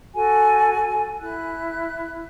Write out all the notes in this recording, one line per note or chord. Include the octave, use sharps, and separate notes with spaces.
F#4 A4 G#5
E4 F#6